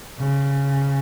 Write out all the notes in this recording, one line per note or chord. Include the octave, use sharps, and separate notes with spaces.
C#3